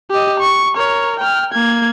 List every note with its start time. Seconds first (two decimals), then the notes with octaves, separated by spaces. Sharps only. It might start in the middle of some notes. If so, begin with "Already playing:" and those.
0.11 G4 D#5
0.40 C#6
0.76 A#4 C#5
1.20 G5 F6
1.53 A#3 G#6